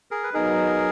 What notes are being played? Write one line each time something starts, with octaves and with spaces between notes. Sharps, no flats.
G#4 A#4
B4
F#3 B3 D#4 G#4 A#4